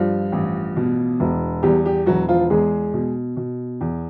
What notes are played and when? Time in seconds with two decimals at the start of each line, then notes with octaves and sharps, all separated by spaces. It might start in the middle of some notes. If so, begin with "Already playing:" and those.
Already playing: G2 F3 F4
0.32 A1
0.77 B2
1.20 E1
1.63 E2 G3 G4
1.86 G3 G4
2.06 E1 F#3 F#4
2.28 F3 F4
2.50 E2 G#3 G#4
2.93 B2
3.37 B2
3.81 E2